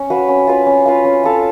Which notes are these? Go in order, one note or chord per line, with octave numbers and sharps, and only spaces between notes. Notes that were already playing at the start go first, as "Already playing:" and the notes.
Already playing: C#4
F#4 B4 F5
C#4
F4 B4 F5
C#4
F4 B4 F5
C#4
F4 A4 F5